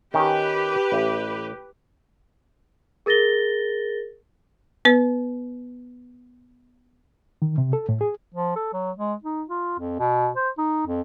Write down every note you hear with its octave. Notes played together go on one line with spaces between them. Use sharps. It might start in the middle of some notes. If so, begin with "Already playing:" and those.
D#3 C#4 G4 B4
A1
G#4 A#4 A6 A#6 G7
B3 B4
D#3
C3
A4
A2
G#4
F3
A4
F#3
G#3
D#4
F4
F2
B2
C5
D#4
F2